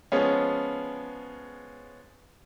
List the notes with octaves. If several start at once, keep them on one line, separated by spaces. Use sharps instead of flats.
F3 G#3 B3 C#4